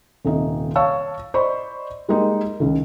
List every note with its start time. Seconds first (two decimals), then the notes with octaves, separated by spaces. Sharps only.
0.25 D#1 C3 D#4
0.76 C#5 F5 A5 C#6 E6
1.34 C5 D5 D#5 B5 C#6
2.09 G3 G#3 A#3 D#4 G4
2.60 C#2 D#3